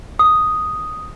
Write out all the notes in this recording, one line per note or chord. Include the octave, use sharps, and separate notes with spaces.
D#6